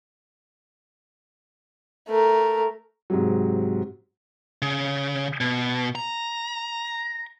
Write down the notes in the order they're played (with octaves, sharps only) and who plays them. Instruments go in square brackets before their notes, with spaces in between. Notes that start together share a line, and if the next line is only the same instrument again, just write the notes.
[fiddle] A3 A#4
[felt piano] G#2 C3 F#3
[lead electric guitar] C#3
B2
A#5